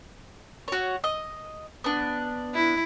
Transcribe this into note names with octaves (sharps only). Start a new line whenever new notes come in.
F#4 C#5
D#5
B3 D4
E4